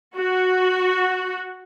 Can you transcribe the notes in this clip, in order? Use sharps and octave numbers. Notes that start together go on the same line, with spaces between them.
F#4